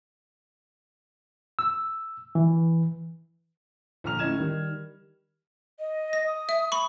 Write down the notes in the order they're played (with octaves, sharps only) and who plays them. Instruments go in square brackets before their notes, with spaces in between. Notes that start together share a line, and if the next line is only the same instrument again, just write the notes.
[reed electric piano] E6
E3
[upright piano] A#1 D3 A#5 F6 F7
A2 C#4 D#5 G#6 E7
D#3 G3
[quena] D#5
[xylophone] A#6
[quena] D#6
[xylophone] E5
B5 C#6